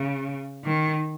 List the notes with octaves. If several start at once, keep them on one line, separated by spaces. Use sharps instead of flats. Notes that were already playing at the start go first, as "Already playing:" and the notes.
Already playing: C#3
D#3